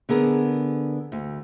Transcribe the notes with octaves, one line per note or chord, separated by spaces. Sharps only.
D3 B3 G#4 A#4
D2